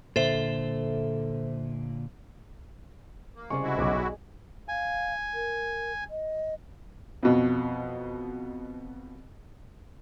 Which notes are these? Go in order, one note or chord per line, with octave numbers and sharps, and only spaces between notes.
A#2 D3 A4 C5 E5
A#3
C2 C#3 G#3 G#4 C5 D5 C#6
E4 F#4
B1 D6
F5 G#5
A#4
D#5
F2 B2